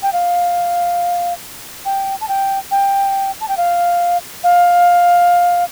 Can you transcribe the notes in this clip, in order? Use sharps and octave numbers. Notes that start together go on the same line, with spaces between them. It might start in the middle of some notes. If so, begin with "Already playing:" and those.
G5
F5
G5
A5
G5
G5
A5
G5
F5
F5